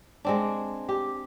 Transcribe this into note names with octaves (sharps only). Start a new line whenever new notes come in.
G#3 C4 D4
G4